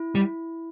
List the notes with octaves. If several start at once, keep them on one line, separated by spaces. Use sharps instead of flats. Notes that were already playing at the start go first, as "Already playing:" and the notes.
Already playing: E4
G3